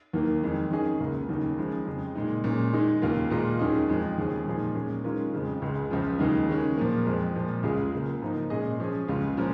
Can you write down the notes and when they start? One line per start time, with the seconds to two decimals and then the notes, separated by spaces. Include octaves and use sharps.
0.13 D#2 D#3 A#3
0.43 F2 D#3 G#3
0.71 D#3 C#4 G#4 D#5
1.00 C#2 C#3 A#3
1.29 D#2 C#3 A#3 D#4
1.58 C#3 F3 G#3 D#4
1.87 F2 C#3 G#3
2.15 A#2 G#3 D#4
2.44 A#2 G#3 C#4
2.73 D#3 G#3 D#4
3.02 D#2 C#3 A#3 F4
3.30 A#2 G#3 F4 A#4 D#5
3.59 D#2 D#3 C#4 G#4 D#5
3.88 F2 F3 G#3 D#4
4.18 D#2 C#3 F3 C#4 G#4
4.47 A#2 F3 G#3 D#4 G#4
4.75 A#2 G#3 C#4
5.04 D#3 G#3 C#4 F4 A#4
5.33 F2 C#3 F3 G#3
5.62 C#2 C#3 G#3
5.91 C#2 C#3 F3
6.19 D#2 C#3 G#3 D#4
6.49 D#3 G#3 C#4
6.77 A#2 F3 A#3
7.06 F2 F3 G#3
7.35 A#2 F3 G#3
7.63 C#2 C#3 G#3 F4 G#4
7.93 C#2 C#3 A#3
8.22 G#2 F3 A#3 D#4
8.50 A#2 G#3 C#4 G#4 D#5
8.80 F3 C#4 G#4
9.08 C#2 C#3 G#3 C#4 F4
9.37 A#2 F3 G#3 C#4 A#4